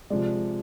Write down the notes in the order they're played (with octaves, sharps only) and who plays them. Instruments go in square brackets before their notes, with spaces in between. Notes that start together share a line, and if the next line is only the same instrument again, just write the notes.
[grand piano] C3 F3 G#3 D5